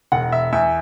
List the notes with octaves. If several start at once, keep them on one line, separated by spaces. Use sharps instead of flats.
E1 F#5
E5
E2 E5